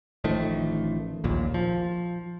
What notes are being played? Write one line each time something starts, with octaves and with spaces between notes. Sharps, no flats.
A1 D#3 F3 A3
A#1 D#2 A#2
F3